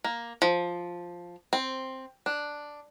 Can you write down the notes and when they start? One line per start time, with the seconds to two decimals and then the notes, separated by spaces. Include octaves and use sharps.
0.04 A#3
0.42 F3
1.53 C4
2.26 D4